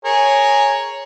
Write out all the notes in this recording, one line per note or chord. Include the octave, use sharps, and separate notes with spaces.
G#4 A#4 C#5